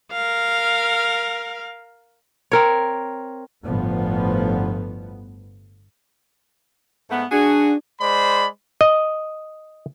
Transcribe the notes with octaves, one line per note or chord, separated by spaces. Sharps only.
A#4 F5
C4 A#4 C#5
G1 A2 F3 B3
G#2 A3 B3
D4 F#4 G#4
G#3 C5 D5 B5
D#5